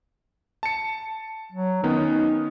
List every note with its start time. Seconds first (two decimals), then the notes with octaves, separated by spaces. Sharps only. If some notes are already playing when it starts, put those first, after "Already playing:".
0.63 A5 C#7
1.53 F#3
1.84 D#3 B3 C#4 D#4